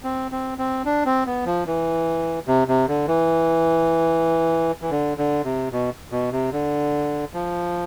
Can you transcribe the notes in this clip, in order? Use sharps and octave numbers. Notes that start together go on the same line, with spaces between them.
C4
C4
C4
D4
C4
B3
F3
E3
C3
C3
D3
E3
E3
D3
D3
C3
B2
B2
C3
D3
F3